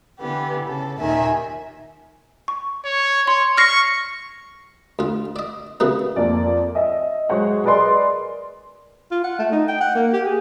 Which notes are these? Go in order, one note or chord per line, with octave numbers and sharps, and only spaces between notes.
D3 E3 B3 G4
C#3 A4
D#2 A#2 D#3 E5 G#5
C#6
C#5
C#5 C6
C#6 F6 A#6 C7
D2 F4
D5 D#5
A#2 C#3 E3 F#3 B3
F2 A#3 D5
D#5 E5
F#3 G#3 C5 C#5 F#5
G#4 A#4 B4 D5 D#5 C6
F4
F#5
A3
D#4
G5
F#5
A#3
G4
G#4